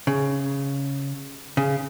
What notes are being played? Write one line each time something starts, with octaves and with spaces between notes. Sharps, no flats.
C#3
C#3